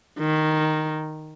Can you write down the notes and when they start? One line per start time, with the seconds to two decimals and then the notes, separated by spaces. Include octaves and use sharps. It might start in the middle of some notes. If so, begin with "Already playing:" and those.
0.19 D#3